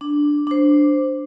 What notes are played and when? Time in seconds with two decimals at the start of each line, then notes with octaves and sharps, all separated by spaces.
0.01 D4
0.47 D4 C5